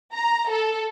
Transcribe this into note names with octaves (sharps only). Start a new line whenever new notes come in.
A#5
A4